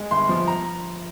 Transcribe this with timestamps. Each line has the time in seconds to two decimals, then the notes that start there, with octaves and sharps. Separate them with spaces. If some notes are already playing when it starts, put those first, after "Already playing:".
Already playing: G#3
0.11 G1 C6
0.29 F3
0.47 A#5